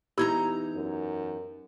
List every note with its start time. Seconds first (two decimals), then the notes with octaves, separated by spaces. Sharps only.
0.18 E2 D#4 E4 G4 A#5 B5 E6 G#6
0.74 F#2